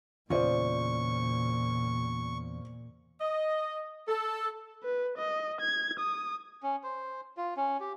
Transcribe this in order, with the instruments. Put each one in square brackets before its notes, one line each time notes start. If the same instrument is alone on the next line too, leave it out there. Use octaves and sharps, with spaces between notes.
[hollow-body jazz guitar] E2 C#3 [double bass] A#2 [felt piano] F4 C5 D5 [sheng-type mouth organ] C#6
[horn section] D#5
A4
[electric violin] B4
D#5
G#6
D#6
[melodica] C#4
C5
F4
C#4
G4